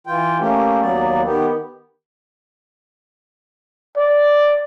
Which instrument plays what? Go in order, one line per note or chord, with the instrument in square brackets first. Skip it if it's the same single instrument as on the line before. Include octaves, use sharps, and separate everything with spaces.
[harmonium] E3 F4 G5
A3 A#3 C#4 G4
D#2 F#3 A#3 B3 D5
D#3 B3 G4
[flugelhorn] D5